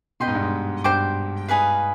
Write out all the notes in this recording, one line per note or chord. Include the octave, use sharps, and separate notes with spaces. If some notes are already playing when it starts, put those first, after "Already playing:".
B2 B4 D#5 G5 C6
G#2
G2
G#2
G2 C5 G5 D6
D#4 G#4 B4 F5